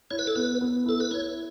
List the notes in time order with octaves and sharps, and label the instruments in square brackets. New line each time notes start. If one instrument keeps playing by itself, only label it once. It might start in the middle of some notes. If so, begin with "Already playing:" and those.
[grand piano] E4 [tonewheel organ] C#5
[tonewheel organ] B4
A4
[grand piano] B3 [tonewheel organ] B4
[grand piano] B3
[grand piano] E4 [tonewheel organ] A4
[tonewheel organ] B4
[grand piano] E4 [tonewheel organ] C#5